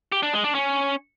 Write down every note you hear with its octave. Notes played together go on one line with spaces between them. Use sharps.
G4
D4
G#3
D4
C#4